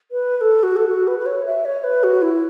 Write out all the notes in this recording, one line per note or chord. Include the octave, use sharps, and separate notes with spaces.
B4
B4
A4
F#4
A4
F#4
B4
B4
C#5
E5
C#5
B4
F#4
E4